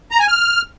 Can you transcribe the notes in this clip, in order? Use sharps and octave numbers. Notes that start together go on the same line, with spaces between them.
A#5
G#5
F6